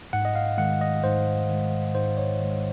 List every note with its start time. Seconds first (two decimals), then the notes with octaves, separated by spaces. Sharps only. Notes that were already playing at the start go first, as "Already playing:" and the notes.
0.13 G#2 F#5
0.25 D#5
0.35 F5
0.58 D#3 G#3 F#5
0.81 D#5
1.04 G#2 C5
1.49 D#3 G#3
1.95 G#2 C5
2.17 C#5
2.40 D#3 G#3